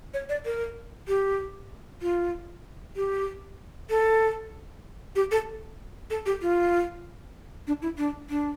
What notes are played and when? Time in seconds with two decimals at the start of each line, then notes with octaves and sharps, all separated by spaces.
0.14 C#5
0.29 D5
0.45 A#4
1.08 G4
2.02 F4
2.96 G4
3.90 A4
5.16 G4
5.31 A4
6.10 A4
6.26 G4
6.42 F4
7.67 D4
7.82 E4
7.98 D4
8.30 D4